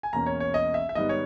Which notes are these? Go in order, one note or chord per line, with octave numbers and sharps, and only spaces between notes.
G#5
E2 B2 A#3 C#4 A#5
C#5
C#5
D#5
E5
E5
G#2 D#3 G3 B3 D#5
C#5